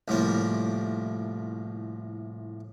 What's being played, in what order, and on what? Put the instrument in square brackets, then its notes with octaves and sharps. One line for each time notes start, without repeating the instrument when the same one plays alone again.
[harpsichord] C2 A2 F3 A#3